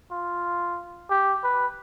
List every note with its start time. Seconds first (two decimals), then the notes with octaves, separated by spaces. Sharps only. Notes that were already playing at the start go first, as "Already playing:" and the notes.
0.11 F4
1.10 G4
1.43 B4